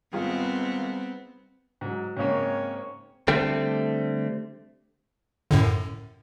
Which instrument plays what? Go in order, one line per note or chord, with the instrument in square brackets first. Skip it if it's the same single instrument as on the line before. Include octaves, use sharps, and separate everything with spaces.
[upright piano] G#1 F4 G#4 [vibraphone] G3 [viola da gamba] B3 C4
[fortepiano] G#2 F#3
[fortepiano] G#2 C#3 A#3 [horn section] C4 C#4 C#5
[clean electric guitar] D3 G3 A3 C4
[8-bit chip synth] F#2 A2 D3